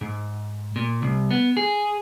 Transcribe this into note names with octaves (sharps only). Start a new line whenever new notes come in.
G#2
A#2
C2
B3
G#4